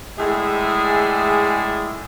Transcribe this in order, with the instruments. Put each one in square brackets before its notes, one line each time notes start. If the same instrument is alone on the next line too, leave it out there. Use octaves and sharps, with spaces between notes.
[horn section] A2 G#3 G#4 D5 E5